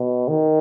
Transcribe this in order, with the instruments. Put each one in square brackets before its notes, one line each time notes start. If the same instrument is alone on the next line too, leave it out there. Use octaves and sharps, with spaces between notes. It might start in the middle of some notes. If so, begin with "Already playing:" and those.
Already playing: [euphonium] B2
D#3